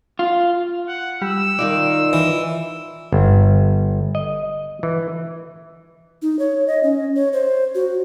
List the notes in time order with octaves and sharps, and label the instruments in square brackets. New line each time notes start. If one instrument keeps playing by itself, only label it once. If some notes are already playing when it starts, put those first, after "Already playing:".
[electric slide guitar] F4
[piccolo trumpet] F#5
[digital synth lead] G3 [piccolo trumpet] E6
[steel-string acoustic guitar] D#3 D#4 F4 [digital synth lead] D5
[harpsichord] E3
[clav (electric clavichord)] G1
D#5
E3
[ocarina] D#4
C#5
D#5
C#4
C#5
C5
F#4